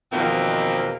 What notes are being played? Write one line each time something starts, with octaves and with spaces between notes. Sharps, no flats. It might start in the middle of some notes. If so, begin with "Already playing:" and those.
E2 B2 D#3 F3 A#3 C4